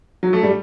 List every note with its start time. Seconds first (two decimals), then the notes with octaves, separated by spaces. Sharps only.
0.23 F#3
0.33 A3
0.43 G3